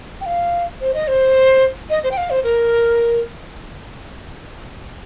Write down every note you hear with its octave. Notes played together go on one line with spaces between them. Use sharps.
G5
F5
C5
D#5
C5
D#5
C5
G5
F5
C5
A#4